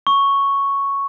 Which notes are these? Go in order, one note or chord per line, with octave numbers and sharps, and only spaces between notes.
C#6